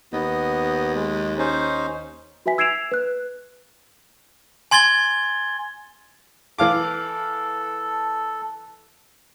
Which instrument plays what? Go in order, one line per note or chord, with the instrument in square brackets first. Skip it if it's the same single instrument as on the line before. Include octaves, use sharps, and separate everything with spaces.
[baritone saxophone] D#2 [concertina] B3 D#5
[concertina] G#3
C#4 D#4 C5
[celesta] F#4 B4 E5 G#5 B6
E6 G#6 C7 D7 E7 F7
B4 F#6
[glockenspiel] G#5 C6 G#6 A6 G7
[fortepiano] E3 F5 D6 [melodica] A4